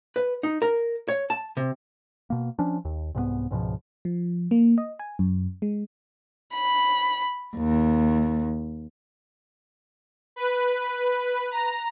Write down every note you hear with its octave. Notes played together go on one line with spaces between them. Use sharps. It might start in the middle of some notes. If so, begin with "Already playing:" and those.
B4
D#4
A#4
C#5
A5
C3
B2 A#3
F3 C#4 D4
D#2
C2 G#2 G3 B3
C#2 G#2 B2 F3
F3
A#3
D#5
G#5
F#2
G#3
B5
D#2
B4
A#5